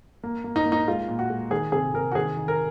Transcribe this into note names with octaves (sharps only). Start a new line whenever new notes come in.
A#3
A#3
D#4
A#3
D#4
G#3 F4
A#2
F#4
G#3
D#3 G#4
C3 G#4
C3 A#4
F#4
D#3 G#4
D#3
A#4